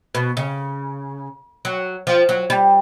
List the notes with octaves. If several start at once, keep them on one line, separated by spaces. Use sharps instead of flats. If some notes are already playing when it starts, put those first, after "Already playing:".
B2
C#3
F#3
F3
F#3
G3